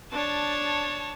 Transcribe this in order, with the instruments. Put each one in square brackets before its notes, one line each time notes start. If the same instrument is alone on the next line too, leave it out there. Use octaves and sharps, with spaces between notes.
[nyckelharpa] D4 [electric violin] C#5 A5